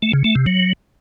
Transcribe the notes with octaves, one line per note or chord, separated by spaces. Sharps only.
A3
C#3
A3
C3
F#3